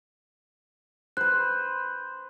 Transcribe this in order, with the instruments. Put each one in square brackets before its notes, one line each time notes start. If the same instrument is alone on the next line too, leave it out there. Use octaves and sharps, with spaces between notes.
[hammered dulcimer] B4 C5 [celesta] F#6